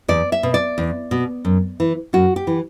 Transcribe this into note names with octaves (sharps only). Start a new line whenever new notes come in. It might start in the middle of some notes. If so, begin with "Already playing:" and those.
E2 D5
E5
B2
D5
E2
B2
F#2
E3
F#2 F#4
G4
E3